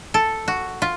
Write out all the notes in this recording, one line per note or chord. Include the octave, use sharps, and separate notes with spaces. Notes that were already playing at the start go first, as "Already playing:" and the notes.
A4
F#4
F4